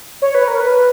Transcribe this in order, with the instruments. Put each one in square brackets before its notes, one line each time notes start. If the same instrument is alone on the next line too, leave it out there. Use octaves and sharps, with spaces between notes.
[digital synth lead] C#5
B4
A#4
B4